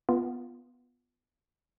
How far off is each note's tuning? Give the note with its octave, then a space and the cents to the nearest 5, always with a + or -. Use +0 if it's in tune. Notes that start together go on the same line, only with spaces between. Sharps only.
B3 +0 F4 +0